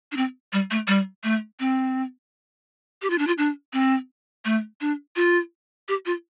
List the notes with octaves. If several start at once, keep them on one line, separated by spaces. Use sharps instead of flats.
D4
C4
G3
A3
G3
A3
C4
G4
F4
D4
F4
D4
C4
A3
D4
F4
G4
F4